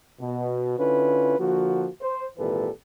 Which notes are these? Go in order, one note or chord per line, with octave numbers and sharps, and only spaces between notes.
B2
D3 C#4 E4 F4 B4
D3 F3 A#3 F#4
C5
G#1 A#2 E3 G4 A4 B4